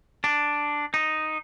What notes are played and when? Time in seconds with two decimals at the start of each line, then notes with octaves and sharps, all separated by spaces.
0.24 D4
0.94 D#4